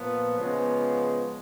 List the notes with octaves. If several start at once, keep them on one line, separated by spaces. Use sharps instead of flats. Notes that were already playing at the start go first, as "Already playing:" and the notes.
Already playing: A#2 F3 B3
C#3 F3 G#3 B3